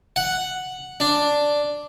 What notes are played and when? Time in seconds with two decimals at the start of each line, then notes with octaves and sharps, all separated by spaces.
0.16 F#5
1.00 D4